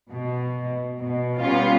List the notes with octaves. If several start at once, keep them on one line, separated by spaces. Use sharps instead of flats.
B2
B2
G3 B3 C#4 F4